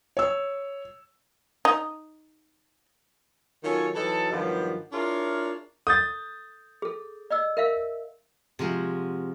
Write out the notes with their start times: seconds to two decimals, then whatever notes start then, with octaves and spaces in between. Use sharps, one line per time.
0.17 C#5 E6
1.65 D#4
3.64 D#3 F#3 C#4 F4 A4 C#5
3.95 E3 F#3 D#4 A4
4.31 G2 D#3 F3 F#3 B3 G4
4.93 D4 E4 F4 G#4 A#4 C#5
5.87 A4 D#6 G6 A6
6.82 G#4 A4
7.31 D5 D#5 E6
7.57 A#4 E5 F5
8.59 C3 F3 G#3 F#4